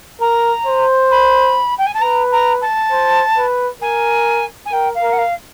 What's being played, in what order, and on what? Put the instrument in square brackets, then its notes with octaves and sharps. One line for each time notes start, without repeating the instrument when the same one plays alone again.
[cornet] A#4 [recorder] A#5
[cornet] C5
[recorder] B5
G5
G#5
A5
[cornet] B4 [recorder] A#5
[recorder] A#5
A5
[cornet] C5
B4
[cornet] A#4 [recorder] G#5
[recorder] G#5
[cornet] A#4 [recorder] G5
[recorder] F5
[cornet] A#4
[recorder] F#5
F5